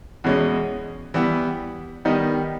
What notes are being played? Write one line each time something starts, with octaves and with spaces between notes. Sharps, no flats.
E2 B2 G#3 C#4
E3 G3 B3
D#3 G3 B3 D#4